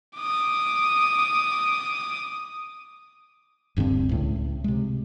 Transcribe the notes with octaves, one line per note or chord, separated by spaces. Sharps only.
D6 D#6
D#1 G2 D3 C4
C#2 A2
C3 G#3